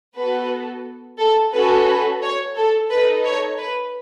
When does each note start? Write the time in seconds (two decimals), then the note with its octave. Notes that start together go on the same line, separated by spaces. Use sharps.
0.16 B3 F#4 A4 B4
1.19 A4
1.53 C#4 F#4 A4 B4
1.87 B4
2.22 C#5
2.56 A4
2.90 D#4 A4 B4
3.24 C#5
3.58 B4